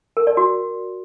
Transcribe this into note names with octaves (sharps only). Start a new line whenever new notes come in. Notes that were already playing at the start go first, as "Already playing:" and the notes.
A#4
D5
F#4